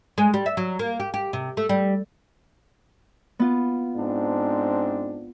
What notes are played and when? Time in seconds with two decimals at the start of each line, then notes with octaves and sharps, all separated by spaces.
0.18 G#3
0.34 G3
0.46 E5
0.57 F#3
0.79 A#3
1.00 G4
1.14 G4
1.33 C3
1.57 A3
1.69 G3
3.39 B3 F4
3.96 G#2 C4 D4